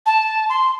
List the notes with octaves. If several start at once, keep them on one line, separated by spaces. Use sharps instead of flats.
A5
C6